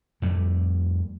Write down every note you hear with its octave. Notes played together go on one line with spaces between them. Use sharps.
F2 G3 A3